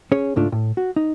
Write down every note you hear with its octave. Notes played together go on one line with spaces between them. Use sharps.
C#4 G#4 C#5
C#2 G#2 A3 D4 F4
A2
F#4
D#4